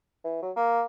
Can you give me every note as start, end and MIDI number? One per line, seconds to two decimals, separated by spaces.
0.24 0.40 52
0.43 0.51 54
0.56 0.82 58